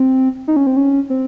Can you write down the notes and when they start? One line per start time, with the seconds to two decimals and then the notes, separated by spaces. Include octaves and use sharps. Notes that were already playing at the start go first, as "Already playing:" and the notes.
Already playing: C4
0.48 D#4
0.56 C#4
0.67 C4
0.77 C#4
1.10 C4